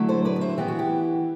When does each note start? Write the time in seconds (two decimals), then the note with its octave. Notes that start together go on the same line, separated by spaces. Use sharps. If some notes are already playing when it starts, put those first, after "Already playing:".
Already playing: D3 F#3 A3 E4
0.08 A4 C5
0.25 B4 D5
0.36 D5
0.41 C5 E5
0.58 E3 B3 E4 G4
0.68 F#4
0.79 E4 G4